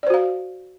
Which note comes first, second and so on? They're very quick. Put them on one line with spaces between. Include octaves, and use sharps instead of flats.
D5 C5 F#4 F5